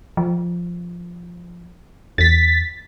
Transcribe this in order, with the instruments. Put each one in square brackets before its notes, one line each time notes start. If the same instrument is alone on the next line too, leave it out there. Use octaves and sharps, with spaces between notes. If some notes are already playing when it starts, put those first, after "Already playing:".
[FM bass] F3
[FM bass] E2 [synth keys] A6 B6